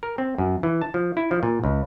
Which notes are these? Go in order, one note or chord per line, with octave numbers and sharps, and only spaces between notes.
A#4
C4
F#2
E3
A5
F3
E4
F3
A#2
C#2